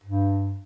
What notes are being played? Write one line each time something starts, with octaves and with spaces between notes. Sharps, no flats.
G2